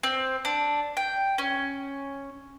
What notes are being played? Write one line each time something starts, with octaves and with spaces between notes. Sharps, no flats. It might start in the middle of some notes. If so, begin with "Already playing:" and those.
C4
D4
G5
C#4